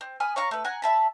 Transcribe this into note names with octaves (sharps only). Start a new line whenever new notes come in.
C4
G#5 B5 D#6 F6
C#5 F5 A#5 C#6
A3 B4
F#5 G#5 A#5 F#6
E5 A5 B5